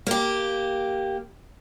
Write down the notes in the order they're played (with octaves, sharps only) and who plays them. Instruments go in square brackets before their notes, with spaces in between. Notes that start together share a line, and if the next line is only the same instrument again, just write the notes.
[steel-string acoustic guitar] A#3 G4